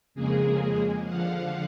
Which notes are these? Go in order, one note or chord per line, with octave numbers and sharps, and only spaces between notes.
F2 C#3 G#3 A#3 G#4
D3 F3 F5 F#5